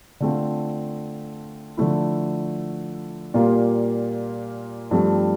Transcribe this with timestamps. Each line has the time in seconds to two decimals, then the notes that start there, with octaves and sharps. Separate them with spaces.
0.20 D3 A3 C4 F4
1.77 D3 F3 A3 E4
3.34 A#2 G3 A#3 F4
4.91 G2 F3 A3 C4